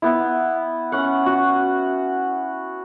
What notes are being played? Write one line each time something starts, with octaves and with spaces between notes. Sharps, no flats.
B3 E4
C#4 F#5
F#4